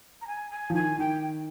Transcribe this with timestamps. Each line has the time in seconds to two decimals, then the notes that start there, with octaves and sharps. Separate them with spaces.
0.21 A#5
0.27 G#5
0.51 G#5
0.70 F3
0.74 D#3 G#5
0.98 D#3 G5